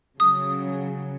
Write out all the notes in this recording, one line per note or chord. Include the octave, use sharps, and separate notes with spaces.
C#3 F#3 D#6